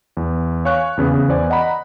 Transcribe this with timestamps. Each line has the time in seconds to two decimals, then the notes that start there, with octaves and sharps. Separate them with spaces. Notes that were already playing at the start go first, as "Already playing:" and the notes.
0.17 E2
0.65 C#5 F5 G#5 C#6 F#6
0.97 E2 C#3 B3 C#4
1.14 C#3
1.28 E2 C5 D5 G#5
1.50 D#5 F#5 A#5 B5